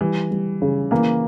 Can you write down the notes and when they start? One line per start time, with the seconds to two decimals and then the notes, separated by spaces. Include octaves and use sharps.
0.01 E3 G3
0.31 G3
0.62 C#3
0.91 E3 A#3